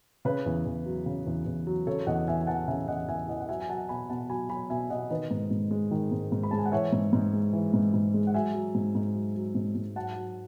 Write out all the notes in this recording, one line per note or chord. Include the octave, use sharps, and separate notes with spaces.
C#3 B4
E2
E2
F#3
C#3
E2
E2
F#3
C#3 A4 C#5
E2 D#5 F#5
E2 E5 G#5
G#5
E3 F#5 A5
C#3 E5 G#5
E2 D#5 F#5
E2 E5 G#5
E3 D#5 F#5
F#5
F#3 E5 G#5
G#5
F#3 F#5 A5
B2 G#5 B5
B2 F#5 A5
F#3 G#5 B5
F#3 G#5 B5
B2 E5 G#5
B2 D#5 F#5
D#3 B4 D#5
G#2
G#2
G#3
D#3
G#2
G#2
B5
G#3 A5
G#5
F#5
E3 C#5 E5
G#2
G#2
G#3
E3
G#2
G#2
G#3
F#5
F#3 E5 G#5
F#3
G#2
G#2
F#3
F#3
G#2
G#2
F#3 F#5 A5
F#3